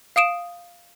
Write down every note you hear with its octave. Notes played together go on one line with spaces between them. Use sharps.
F5 D#6 D7 E7